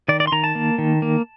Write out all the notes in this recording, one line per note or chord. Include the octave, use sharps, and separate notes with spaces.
D#3 D5
D5
C6
D#3 A#5
A5
A#3
D#3
A#3